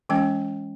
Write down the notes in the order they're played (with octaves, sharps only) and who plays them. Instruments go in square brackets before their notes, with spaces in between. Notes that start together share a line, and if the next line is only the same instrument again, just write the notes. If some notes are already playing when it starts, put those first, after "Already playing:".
[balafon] E3 G#3 C#4 G5